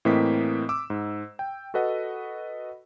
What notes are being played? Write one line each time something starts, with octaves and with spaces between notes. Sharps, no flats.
A2 E3 A#3 C4 D#5 B6
D6 E6
G#2
G5
F#4 A4 B4 D#5 F#5